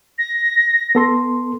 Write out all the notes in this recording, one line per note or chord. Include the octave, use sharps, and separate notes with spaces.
A#6
B3 A4 C6